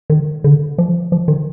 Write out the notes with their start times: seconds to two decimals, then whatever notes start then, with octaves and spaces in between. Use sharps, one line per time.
0.10 D#3
0.44 D3
0.78 F3
1.12 F3
1.28 D#3